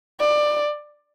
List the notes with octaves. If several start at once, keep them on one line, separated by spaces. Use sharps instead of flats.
D5